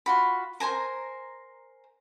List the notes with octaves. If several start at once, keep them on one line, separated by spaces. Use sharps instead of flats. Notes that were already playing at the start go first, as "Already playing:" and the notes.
F4 F#4 B5
A#4 C5 G#5 A#5